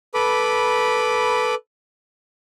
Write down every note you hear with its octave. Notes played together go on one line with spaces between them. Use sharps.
A4 B4 B5 D6